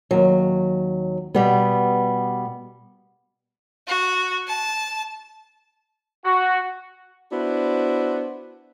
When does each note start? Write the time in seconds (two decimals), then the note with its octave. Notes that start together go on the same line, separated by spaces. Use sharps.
0.11 D#2 F#3
1.35 B2 G3 B3
3.87 F#4
4.48 A5
6.25 F#4
7.31 B3 D4 E4 F#4 C5